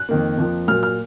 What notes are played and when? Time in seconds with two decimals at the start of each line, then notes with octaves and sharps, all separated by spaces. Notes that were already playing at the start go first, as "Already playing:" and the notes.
Already playing: F#6
0.09 F2 D#3 A#3
0.38 F2 F3 A#3
0.68 A#2 F#3 A#3 F6
0.83 F6